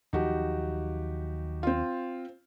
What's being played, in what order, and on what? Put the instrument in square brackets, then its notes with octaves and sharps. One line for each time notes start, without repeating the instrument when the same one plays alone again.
[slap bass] D#2 F3 F#3 [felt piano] D#4 F#4 G4
[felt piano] C4 F4